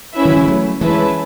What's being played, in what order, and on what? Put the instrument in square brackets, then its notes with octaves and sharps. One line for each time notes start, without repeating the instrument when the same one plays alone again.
[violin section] C#4 E4 B4 E5
[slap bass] D#3 F#3
E3 G#3
F#3 A3
[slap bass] E3 G#3 [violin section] C#4 E4 B4 E5 A5